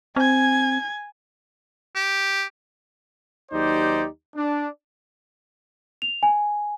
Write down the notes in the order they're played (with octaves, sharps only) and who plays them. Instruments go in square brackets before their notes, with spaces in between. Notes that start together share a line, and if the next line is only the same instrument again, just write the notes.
[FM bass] C4 [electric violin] G#5 G#6
[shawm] G4
[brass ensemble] D#2 F#3 D#4 G4 C5 D5
D4
[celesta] F7
G#5